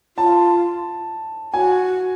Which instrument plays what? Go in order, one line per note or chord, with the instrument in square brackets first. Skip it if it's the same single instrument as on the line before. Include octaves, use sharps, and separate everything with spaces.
[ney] F4 [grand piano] A5
[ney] F#4 [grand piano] G#5